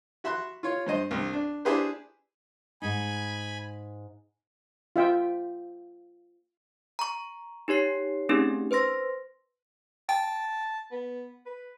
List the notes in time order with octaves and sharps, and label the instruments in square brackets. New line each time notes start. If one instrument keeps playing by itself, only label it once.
[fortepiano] F#4 E5 B5 C6 F#6
F4 C#5
G2 C5 D#5
C2 G2
D4
D4 E4 G4 G#4 B4 C5
[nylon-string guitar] G#2 D#4 [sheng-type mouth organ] G#5 B5
[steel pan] F4 E5 G5
[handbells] A#5 C#6
D#4 G4 C#5 C7
A3 C4 C#4 D#4 G4 G#4
B4 C5 C6 A#6
[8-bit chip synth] G5 [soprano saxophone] A5
[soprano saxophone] B3
B4